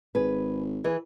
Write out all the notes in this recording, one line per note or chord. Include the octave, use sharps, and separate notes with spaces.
G#1 G#4 B4
E3 G#4 B4